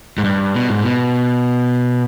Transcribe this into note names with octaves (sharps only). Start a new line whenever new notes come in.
G#2
G2
B2
G#2
B2